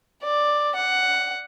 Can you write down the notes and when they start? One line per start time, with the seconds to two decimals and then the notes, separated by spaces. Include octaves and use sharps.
0.23 D5
0.75 F#5